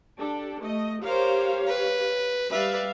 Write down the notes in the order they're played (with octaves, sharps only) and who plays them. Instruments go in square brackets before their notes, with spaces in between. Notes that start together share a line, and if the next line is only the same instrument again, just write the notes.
[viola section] D4 G4 A4
A3 D#5
[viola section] G4 C#5 F5 [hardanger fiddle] A#4 C5
[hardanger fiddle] B4
[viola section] G3 E5 F5 [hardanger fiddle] B4 D5